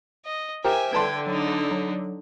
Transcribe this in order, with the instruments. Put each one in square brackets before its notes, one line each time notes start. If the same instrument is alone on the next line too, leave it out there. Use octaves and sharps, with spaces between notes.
[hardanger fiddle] D#5
[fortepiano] G4 A#4 [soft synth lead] C5 [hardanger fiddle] E5 G#5
[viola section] D3 [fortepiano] B4 A5 C6 [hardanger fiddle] G5 [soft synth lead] G#6
[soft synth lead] F#3 [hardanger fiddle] D4 D#4
[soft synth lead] F#3